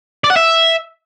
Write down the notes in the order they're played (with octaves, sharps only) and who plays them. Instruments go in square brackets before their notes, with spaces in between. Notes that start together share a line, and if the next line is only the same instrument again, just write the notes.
[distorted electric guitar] D5
F#5
E5